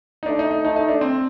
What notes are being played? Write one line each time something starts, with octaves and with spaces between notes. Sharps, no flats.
D#4
A3 D4
D#4
D#4
A3 D#4
D#4
D4
C4